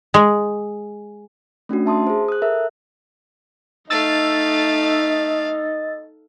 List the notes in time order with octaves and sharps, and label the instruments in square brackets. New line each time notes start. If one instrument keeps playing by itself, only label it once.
[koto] G#3
[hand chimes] A3 C#4 D4 F#4
E5 A5 C6 D#6
G#4 C5
D#6 F#6
A4 A#4 E5
[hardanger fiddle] A3 F5 [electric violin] D#4 [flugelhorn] D#5 [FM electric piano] E6 A6